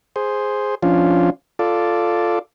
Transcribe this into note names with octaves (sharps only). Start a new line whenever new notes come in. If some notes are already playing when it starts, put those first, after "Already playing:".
G#4 C5
F3 C#4 D4 F4
F4 A4 D5